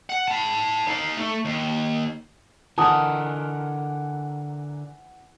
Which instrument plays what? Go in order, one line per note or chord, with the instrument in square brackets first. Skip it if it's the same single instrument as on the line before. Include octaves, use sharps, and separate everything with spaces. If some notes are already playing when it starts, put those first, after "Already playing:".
[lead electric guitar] F#5
A5 B5
D#4 F5
A3
D#2
[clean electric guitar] D3 A#4 [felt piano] E3 [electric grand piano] F#5 G#5 [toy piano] A5 D#6